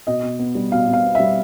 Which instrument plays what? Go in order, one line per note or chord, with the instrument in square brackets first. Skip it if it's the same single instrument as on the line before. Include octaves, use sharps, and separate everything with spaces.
[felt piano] B2 D#5
B2
B3
G3
B2 F5
B2
F5
B3
G3 E5